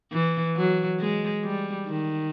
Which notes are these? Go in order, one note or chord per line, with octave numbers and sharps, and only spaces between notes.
E3
F#3
G#3
G3
D#3